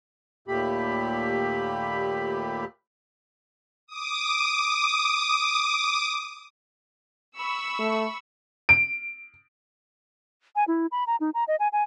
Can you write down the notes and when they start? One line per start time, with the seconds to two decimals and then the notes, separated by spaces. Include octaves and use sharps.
0.48 D#2 A#2 A3 G4 B5
3.87 D6 D#6
7.38 B5 C#6 E6
7.79 A3
8.69 D7
10.56 G#5
10.68 E4
10.92 B5
11.07 A#5
11.20 D#4
11.34 A#5
11.48 D#5
11.60 G#5
11.72 G#5